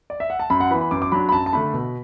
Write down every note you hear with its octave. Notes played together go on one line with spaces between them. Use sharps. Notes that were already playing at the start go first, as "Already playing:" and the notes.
D5
E5
F#5
A5
F#2 B5
F#5
E3 B3 B5
B5
F#2 D6
D6
F#3 D4 B5
B5
F#2 A5
A5
D3 A3 D4 B5
B2